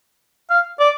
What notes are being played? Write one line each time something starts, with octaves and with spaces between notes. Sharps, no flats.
F5
D5